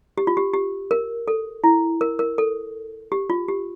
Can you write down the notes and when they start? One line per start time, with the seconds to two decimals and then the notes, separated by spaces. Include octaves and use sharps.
0.18 G4
0.27 F4
0.37 G4
0.54 G4
0.91 A#4
1.28 A4
1.64 E4
2.01 A#4
2.19 A#4
2.38 A4
3.12 G4
3.30 F4
3.48 G4